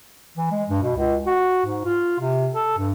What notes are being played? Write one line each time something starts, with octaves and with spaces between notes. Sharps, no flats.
E3
G#3
G2
B2
C#2
F#4
G#2
F4
C3
A4
G2